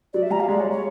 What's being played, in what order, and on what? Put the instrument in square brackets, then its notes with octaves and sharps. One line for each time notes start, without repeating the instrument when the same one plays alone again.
[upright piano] F#3 [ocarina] D5
[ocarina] E5
[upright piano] G3 [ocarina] A#5
[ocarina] F5
[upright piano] G#3 [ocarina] D5
[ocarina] C#5
C#5